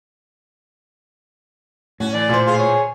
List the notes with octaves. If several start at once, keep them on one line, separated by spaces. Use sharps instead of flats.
A2 C#4 F#4
D3 E3 D5
A#2 C5
D3 F4 G#4
C#5